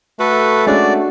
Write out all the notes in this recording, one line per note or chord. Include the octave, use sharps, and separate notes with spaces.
A3 F#4 A4 B4
G#3 C#4 D4 F#4 D5